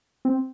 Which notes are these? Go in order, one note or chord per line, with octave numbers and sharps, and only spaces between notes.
C4